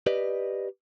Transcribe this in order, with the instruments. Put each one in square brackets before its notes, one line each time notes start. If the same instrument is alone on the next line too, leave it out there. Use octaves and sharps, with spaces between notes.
[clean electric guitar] G4 B4 D5 D#5